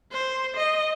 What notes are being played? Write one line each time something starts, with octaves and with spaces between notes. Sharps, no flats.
C5
D#5